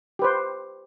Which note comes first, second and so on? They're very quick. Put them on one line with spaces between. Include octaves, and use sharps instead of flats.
G4 B4 C5